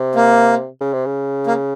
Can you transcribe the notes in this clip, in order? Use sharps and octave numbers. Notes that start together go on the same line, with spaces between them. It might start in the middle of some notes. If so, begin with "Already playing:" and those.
Already playing: C3
A#3
C#3
C3
C#3
A#3